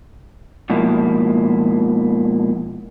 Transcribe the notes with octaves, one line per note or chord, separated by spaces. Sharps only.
G#2 B2 F3 A#3 E4